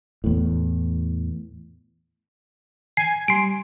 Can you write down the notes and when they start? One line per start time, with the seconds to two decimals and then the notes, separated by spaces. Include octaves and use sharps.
0.24 E2 A2
2.97 G#5 C7
3.28 G3 C6 C7 D7